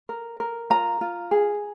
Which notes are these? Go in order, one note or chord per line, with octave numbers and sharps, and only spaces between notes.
A#4
A#4
F4 A#5
F4
G#4